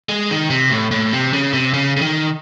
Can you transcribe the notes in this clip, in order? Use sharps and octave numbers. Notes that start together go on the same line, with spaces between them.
G#3
D#3
C3
A2
A2
C3
C#3
C3
C#3
C#3
D#3